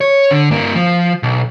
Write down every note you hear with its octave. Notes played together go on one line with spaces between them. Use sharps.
C#5
D3
G2 A#3
F3
B1